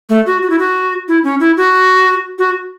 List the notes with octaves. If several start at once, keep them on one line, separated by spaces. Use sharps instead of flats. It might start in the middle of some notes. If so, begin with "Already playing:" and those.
A3
F#4
F#4
E4
F#4
E4
C#4
E4
F#4
F#4